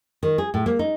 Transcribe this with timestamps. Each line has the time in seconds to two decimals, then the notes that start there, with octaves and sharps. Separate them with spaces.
0.23 D#3
0.38 G#4
0.54 A2
0.66 A#3
0.79 D#4